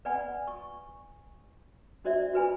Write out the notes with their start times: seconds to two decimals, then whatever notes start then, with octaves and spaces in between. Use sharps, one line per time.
0.05 B4 D5 F#5 G#5 B5
0.47 C#6
2.05 D4 F#4 C5 D5 E5
2.34 F#4 B4 G#5 B5